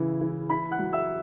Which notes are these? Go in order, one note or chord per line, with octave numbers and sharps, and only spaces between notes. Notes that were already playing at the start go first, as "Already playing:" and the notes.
Already playing: C#3 E3 E4
E3
E4 B5 B6
F#5 F#6
F#3
E5 E6